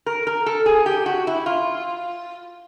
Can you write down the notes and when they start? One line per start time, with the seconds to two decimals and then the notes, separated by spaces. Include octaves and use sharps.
0.06 A#4
0.27 A#4
0.46 A4
0.66 G#4
0.86 G4
1.06 F#4
1.27 E4
1.46 F4